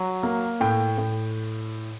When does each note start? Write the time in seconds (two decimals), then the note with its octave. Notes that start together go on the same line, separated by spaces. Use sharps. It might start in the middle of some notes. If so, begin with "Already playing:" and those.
Already playing: F#3
0.23 A#3
0.61 A2 G5
0.98 A2